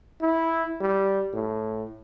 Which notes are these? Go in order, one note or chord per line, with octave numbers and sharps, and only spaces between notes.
E4
G3
A2